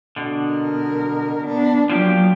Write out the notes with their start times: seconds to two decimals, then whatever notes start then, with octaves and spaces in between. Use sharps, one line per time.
0.16 B2 D3
0.50 A#4
1.46 B3 D4
1.90 F3 F#3 A#3 G4